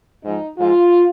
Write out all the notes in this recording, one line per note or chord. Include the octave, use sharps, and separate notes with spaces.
G#2 F3 D#4
G#2 F3 F4